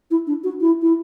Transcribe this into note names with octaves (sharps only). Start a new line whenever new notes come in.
E4
D4
F#4
E4
E4